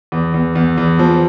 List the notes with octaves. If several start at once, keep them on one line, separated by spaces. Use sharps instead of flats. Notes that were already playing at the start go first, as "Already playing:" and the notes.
E2
E2
E2
E2
F3